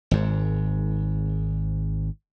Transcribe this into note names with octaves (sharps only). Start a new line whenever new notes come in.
G#1 G#2